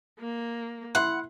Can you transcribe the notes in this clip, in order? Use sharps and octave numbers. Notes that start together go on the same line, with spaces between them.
A#3
E4 F#5 C6